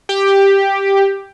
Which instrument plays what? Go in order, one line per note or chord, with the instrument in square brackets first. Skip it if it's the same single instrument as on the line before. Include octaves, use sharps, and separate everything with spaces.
[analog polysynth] G4